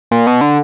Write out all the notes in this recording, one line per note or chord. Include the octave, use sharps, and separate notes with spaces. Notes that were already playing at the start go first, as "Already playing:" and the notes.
A#2
B2
D3